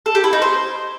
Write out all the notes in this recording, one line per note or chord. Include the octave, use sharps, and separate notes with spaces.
A4
G4
E4
D#4
C5